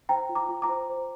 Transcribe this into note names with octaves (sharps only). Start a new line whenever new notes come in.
C5 G5 A#5
F4
A#5 D6
F4
A#5 D6
C5
C5